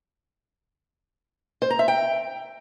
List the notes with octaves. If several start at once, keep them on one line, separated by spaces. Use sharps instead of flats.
C5
A#5
E5
G5